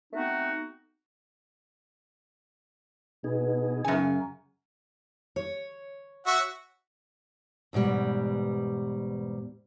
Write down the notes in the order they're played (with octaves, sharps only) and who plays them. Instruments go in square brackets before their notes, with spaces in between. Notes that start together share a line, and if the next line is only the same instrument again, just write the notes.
[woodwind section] A3 B3 C4 D#4 F#4
[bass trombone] B2 [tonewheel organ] B3 D#4 G#4
[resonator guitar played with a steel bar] F#2 G#5 [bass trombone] C#3
[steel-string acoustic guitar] C#5
[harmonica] F#4 E5 F#5
[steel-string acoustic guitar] E2 G#2 B2 G3